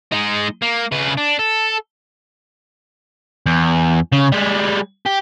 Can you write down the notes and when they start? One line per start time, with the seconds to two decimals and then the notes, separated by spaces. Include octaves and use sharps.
0.12 G#3 D#4
0.62 A#3
0.92 C#3 B4
1.17 D4
1.39 A4
3.46 E2
4.12 C#3
4.32 G3 G#3
5.06 G4